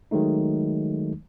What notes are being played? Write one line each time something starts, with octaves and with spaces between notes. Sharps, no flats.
D#3 F#3 G#3 A3 D#4